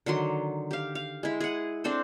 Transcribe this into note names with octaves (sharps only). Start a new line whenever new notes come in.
D3 D#3 F#3 C6
G4 F5
F5
G#3 E4
G#4 F#5
C4 D4 A4 C5